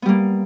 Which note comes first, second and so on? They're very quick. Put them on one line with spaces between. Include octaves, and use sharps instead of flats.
B3 G3 A#3